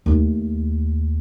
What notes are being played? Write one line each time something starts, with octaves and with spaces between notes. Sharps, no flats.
D#2 A3